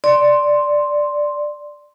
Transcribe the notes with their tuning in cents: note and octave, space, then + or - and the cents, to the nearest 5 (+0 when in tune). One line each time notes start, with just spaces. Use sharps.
D5 +0 C6 +0